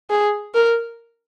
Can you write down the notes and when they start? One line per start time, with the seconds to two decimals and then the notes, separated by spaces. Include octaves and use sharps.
0.10 G#4
0.54 A#4